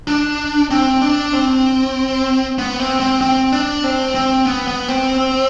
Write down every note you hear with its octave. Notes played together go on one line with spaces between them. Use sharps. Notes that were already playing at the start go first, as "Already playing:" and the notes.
D4
C4
D4
C4
B3
C4
C4
C4
D4
C4
C4
B3
B3
C4